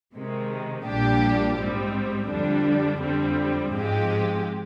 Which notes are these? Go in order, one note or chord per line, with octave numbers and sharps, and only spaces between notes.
C3 D#3 G#3
A#1 A#2 G3 D4 G4
G#2 G3 C4
F2 D3 G3 D4
F2 D3 G3 C4
G#2 F3 G#3 C4 G4